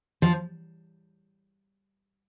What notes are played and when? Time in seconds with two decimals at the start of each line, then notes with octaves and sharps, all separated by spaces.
0.22 F3